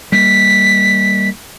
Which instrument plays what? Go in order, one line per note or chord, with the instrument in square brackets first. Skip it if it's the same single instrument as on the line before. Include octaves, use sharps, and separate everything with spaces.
[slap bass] G3 A#3 [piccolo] B6